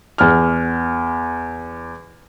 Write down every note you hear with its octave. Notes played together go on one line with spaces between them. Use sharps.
E2 F6